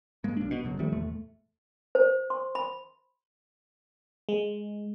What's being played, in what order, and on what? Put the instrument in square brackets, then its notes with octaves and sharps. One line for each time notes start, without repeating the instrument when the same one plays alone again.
[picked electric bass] G#2 G#3 A#3
B1 D4
B2
F#1 C#2 F#2
D#3 F3 G3 A3
F1 E2 A2 A3
[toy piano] C5
C6
B5
[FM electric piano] G#3